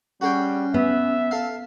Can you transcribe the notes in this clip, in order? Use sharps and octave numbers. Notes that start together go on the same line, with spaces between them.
G3 C#4 F#4 G#4 G5
B3 E5
A4 F5